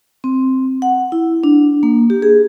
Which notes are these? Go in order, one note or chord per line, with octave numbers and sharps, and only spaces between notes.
C4
F#5
E4
D4
A#3
G4
G#4